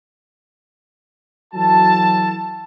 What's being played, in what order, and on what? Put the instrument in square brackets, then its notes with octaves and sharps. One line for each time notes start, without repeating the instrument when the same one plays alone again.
[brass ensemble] E3 F#3 F#4 A4 A5